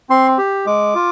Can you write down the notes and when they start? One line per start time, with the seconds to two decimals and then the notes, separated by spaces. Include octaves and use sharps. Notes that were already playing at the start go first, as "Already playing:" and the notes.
0.10 C4 C6
0.38 G4
0.66 G#3 D6
0.95 F4